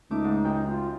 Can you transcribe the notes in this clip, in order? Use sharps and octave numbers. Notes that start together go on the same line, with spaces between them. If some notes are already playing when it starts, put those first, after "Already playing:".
C#2 A3 D#4 D6
G#2
F#2 G5
F4